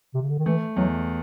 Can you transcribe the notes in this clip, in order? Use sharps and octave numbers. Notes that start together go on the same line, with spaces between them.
C3
C#3
D3
D#3
E3 A3
E2 F#3